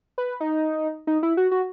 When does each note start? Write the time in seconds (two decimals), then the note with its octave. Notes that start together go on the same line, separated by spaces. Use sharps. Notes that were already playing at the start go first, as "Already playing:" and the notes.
0.18 B4
0.40 D#4
1.07 D#4
1.23 E4
1.37 F#4
1.51 F#4